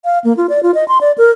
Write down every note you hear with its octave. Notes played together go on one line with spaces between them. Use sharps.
F5
A#3
F4
D5
F4
D#5
C6
D5
A#4